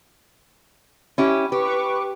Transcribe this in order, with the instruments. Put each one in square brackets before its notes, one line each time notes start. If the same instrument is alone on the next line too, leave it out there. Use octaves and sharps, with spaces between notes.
[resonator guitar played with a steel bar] C#4 E4 G4
[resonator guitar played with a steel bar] G4 [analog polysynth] B4 C#6 D6